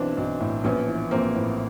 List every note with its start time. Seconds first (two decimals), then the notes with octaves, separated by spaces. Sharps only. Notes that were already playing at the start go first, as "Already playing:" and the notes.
Already playing: B1 E3 C4 D4
0.17 B1
0.40 A2
0.64 A#1 B3 C#4
0.88 E3
1.11 A#1 A#3 C4
1.35 A2